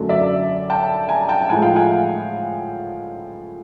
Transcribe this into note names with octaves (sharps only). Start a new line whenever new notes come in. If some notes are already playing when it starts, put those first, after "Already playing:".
Already playing: F#2 D3 F#3 A3
D5 E5
G5 A5
G#5 A#5
G5 A5
A2 F3 G#3 F#5 G#5
F5 G5
F#5 G#5